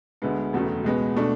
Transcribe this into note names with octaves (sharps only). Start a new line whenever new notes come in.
D2 D3 G#3 B3
E1 E2 C#3 F#3 A3
C#2 B2 G#3 B3
B2 A3 D4